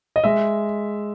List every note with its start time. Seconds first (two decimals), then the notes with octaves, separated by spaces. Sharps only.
0.16 D#5
0.24 G#3 E5